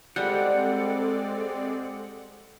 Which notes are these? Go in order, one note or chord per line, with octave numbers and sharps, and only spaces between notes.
G3 G#3 C4 A4 D5 F#5